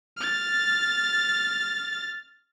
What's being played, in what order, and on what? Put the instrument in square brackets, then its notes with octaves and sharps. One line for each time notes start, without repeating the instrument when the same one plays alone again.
[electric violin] F6 A6